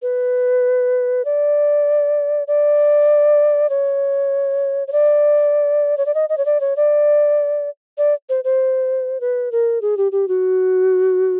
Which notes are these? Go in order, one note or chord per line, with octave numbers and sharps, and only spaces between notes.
B4
D5
D5
C#5
C#5
D5
C#5
D5
D#5
D#5
C#5
D5
C#5
D5
D5
C5
C5
B4
A#4
G#4
G4
G4
F#4